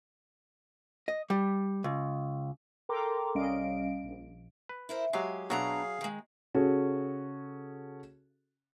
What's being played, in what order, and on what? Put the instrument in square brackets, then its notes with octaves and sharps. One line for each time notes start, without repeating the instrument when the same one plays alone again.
[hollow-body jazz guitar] D#5
G3
C#2
[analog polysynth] A4 A#4 G5 A#5 C6 D6
C2 G3 C#4 D#5 F5 D7
A#1
[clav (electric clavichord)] B4
[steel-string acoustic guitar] E4 A#4 C5
[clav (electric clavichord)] F#3 G#3 [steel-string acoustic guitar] G4 G#4 F5
[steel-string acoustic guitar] B2 D4 A#5 [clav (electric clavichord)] F#3 F#4 E5 [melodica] G#4 F5
[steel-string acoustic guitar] D#3 G#3
[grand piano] C#3 C#4 F#4 G#4 A4